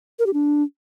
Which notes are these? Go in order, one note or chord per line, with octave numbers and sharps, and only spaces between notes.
A#4
G4
D4